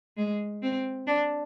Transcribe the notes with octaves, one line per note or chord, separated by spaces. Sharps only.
G#3
C4
D4